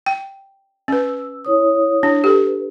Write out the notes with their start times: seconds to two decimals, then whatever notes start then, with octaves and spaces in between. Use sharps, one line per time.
0.06 G5
0.88 C#4 B4 E6
1.45 E4 C#5 D#6
2.03 D4
2.24 G4 A4 B4